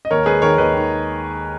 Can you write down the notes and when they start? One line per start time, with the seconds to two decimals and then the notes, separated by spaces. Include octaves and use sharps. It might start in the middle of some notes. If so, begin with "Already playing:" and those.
0.05 D#5
0.11 D#2 A#4 C#5
0.26 G#3 G#4 B4
0.42 D#3 A#4 C#5
0.58 D#2 B4 D#5
0.73 D#3